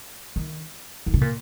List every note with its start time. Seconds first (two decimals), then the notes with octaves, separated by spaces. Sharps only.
0.36 D#3
1.06 D#3
1.14 C#3
1.21 A#2